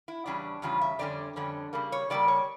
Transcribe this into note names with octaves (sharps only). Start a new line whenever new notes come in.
E4
E2 C#3 G3 C#4 D4
E2 C#3 G3 C#4 F4
E5
F2 D3 G3 C#4 D5
F2 D3 G3 C#4
C#3 G3 A#3
C#5
C#3 G3 A#3 D5
C#5